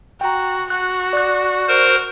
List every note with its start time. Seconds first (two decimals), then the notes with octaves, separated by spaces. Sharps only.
0.21 F#4 G5 A#5
0.70 F#4 F#6
1.13 D5 F#6
1.68 A#4 C5